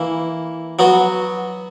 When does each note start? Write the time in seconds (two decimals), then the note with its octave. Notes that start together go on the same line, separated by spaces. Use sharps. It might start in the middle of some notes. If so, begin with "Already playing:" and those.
Already playing: E3 A#3 E4
0.79 F#3 B3 F#4